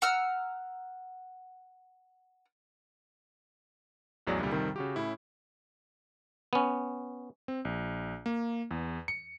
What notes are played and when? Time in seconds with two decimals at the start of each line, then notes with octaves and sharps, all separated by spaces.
0.02 F#5 A#5 E6 F6
4.27 A1 E2 F#3 G#4 D5
4.39 C2 A#2 D3 G3
4.52 F2 C3 D#3 G3
4.76 C#3 F#4 G4
4.96 A2 C#4 E4
6.53 B3 C#4
7.48 C4
7.65 A#1
8.26 A#3
8.71 E2
9.08 C#7